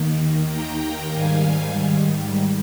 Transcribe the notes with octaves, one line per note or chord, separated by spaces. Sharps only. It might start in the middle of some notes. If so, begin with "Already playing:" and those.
Already playing: D#2 D#3 A#3
G5 A#5
G#2 D#3 G3 F5 G#5